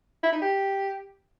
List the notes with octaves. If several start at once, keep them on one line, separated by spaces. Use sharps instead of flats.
E4
D#4
G4